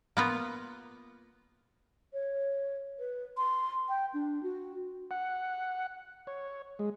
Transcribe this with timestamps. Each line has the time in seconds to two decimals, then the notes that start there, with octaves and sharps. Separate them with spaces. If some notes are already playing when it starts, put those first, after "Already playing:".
0.17 A#3 B3 F4
2.13 C#5
2.99 B4
3.37 C6
3.89 G5
4.14 D4
4.43 F#4
5.11 F#5
6.27 C#5
6.79 G#3